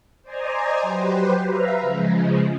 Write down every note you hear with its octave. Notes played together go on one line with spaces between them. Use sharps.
C5 D5 D#5 G#5 A#5
F#3 G4 B4 C5
B4 E5 F5 A#5
C#3 F3 G#3